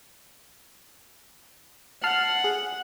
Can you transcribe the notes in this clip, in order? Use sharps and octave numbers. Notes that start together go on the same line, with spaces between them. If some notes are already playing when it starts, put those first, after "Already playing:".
F#5 A5 F6 C7
G#4